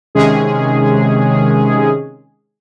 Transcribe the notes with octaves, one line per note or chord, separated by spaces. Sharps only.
C3 D#3 G#3 C#4 G#4